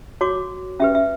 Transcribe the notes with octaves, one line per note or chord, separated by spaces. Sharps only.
F#4 C#5 D6
C#4 G4 B4 E5
E5